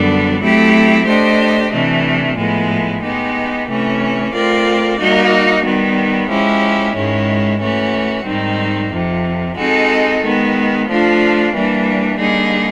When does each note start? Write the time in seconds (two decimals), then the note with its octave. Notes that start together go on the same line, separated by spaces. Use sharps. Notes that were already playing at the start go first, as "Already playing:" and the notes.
Already playing: F#2 D3 G3 B3 D4
0.40 F#3 A3 C4 E4 G4
1.05 A3 D4 G4 C5 D#5
1.71 C3 E3 A3 D4
2.35 A2 F3 G#3 B3 E4
3.01 G#3 B3 D#4 G4
3.66 C3 E3 A3 C#4
4.32 A3 C4 F4 A#4 D5
4.98 G3 A#3 D#4 F#4
5.63 D#3 G3 B3
6.28 F3 G#3 C#4 E4 G4
6.94 G#2 D#3 G#3 C#4 E4
7.60 E3 A3 C#4 F#4
8.25 G#2 D#3 G3 C4 D#4
8.90 F2 C3 F3
9.56 G#3 C4 D#4 F#4 A4
10.21 D#3 G#3 B3
10.87 F3 A3 D4 F4
11.53 E3 G3 A#3 D4
12.17 D3 G3 A#3 D#4 G#4